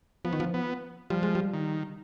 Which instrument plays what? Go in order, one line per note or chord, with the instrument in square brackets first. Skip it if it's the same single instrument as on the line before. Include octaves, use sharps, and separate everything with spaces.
[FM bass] F3 [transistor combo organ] B3
[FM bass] D#3
F3
[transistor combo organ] B3
[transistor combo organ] F3 [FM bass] G3
[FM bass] G#3
G3
[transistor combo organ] D#3